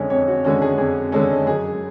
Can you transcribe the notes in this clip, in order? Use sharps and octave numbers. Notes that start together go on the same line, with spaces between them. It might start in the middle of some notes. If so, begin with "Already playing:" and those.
Already playing: F2 D3 G#3 C#4 C#5
F2 C#5
F#4
D3 G#3 C#4 F#4
G#4
F2 G#4
D3 G#3 C#4 A4
F#2 G#4